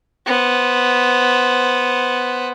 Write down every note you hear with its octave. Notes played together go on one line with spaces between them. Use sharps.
B3 C5